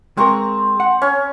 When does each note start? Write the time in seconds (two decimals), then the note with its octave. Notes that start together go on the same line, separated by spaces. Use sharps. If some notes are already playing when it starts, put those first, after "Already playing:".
0.17 G#3 C4 A#4 A#5 C#6
0.80 F#5
1.02 C#4 C#5